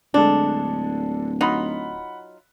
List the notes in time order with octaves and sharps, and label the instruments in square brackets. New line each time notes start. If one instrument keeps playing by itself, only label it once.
[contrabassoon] D1 [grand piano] D3 G#3 A4 [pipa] D4
[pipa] F#3 D#4 F4 [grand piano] F#5 B5